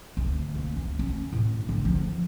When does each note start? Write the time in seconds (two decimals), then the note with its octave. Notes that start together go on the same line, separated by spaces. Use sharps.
0.17 D2
0.55 A#3
0.76 D2
0.99 C#4
1.33 A2
1.69 D3
1.85 F3